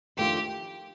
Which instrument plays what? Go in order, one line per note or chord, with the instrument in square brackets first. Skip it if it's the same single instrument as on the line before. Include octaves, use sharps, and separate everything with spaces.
[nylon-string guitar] F2 D#3 A3 D4 F4 [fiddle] G4